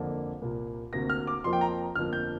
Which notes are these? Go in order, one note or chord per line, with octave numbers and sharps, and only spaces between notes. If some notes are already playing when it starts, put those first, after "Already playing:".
Already playing: F2 D3 A#3
C2 A#2 A#3
D2 C3 A#3 A#6
F6
D6
F2 F3 A#3 C6
G5
A#5
G1 F2 F3 A#3 F6
G6